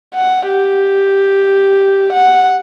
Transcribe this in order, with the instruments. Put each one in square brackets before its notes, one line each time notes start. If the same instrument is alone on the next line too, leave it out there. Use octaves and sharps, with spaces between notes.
[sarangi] F#5
G4
F#5